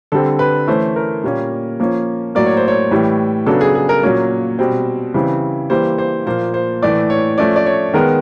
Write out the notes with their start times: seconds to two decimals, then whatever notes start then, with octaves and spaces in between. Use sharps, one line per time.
0.12 D3 G3 C4 A4
0.39 B4
0.68 E3 A3 C#4 C5
0.96 A#4
1.24 A#2 G3 A#3 C#4
1.80 F3 A#3 C#4
2.35 A2 F#3 A#3 D5
2.46 C#5
2.57 C5
2.68 C#5
2.91 A2 E3 G3
3.46 C#3 F#3 B3 D4 A4
3.61 G#4
3.75 G#4
3.89 A#4
4.03 A#2 F#3 A#3 C#4
4.59 B2 G3 C4
5.14 C#3 E3 G3 C4
5.70 E3 G3 A#3 C5
5.98 C5
6.26 A#2 F3 A#3 C5
6.54 C5
6.82 A2 E3 A3 D5
7.10 C#5
7.38 F3 A3 C#4 D5
7.56 D5
7.66 C#5
7.94 D#3 G#3 B3 A#4